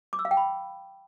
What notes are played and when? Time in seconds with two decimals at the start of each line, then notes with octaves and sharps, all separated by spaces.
0.13 D6
0.19 E6
0.25 F5
0.31 G5
0.37 B5